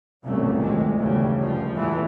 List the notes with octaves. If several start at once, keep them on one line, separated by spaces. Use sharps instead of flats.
G1 C2 F#2 A#2 C#3 A3
D2 D#3 G#3
E2 A2 C#3 F#3 G3
F1 F#2 F3
E2 A2 E3 G3 A3 B3